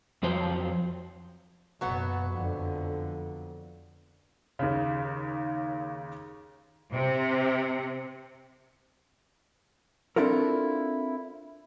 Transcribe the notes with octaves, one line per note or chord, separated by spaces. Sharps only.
F2 F3 F#3 C5
F#1 B2 F#3 B3 F#5
F2 D3
D#2 C#3
C3
C4 D4 E4 F4 A4 A#4